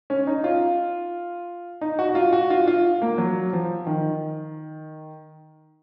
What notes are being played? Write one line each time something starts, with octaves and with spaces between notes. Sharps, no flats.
C#4
D#4
F4
D#4
F#4
F#4
F4
F#4
F4
F4
A#3
F#3
F3
D#3